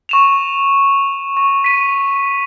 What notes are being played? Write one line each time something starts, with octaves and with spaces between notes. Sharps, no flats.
C#6 E7 F7
C#6
B6 D#7